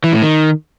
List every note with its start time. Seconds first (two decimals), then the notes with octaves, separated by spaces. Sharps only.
0.04 E3
0.13 A2
0.23 D#3